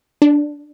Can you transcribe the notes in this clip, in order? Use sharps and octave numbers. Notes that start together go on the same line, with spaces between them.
D4